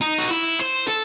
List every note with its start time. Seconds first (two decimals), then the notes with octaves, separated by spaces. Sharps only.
0.01 D#4
0.18 F#4
0.31 E4
0.59 C5
0.88 A4